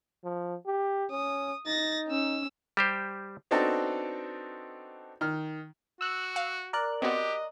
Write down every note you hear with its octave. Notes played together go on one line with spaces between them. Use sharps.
F3
G4
C#4 D#6
D#4 A6 A#6
C#4 E6
G3 G4 C5
B3 C4 D4 D#4 F#4 A4
D#3 F6
F#4 E6 F#6
F5
A#4 D5 F#6
B3 C4 F#4 G4 D#5